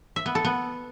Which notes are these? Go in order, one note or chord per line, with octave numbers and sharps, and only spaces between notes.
E5
B3
A4
B3